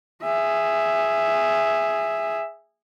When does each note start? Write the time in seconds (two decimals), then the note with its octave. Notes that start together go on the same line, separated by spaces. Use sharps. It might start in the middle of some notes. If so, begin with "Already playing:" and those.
0.23 G#4 E5